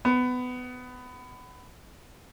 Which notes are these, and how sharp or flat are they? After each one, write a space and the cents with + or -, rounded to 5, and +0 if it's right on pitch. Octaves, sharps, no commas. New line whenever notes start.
B3 +20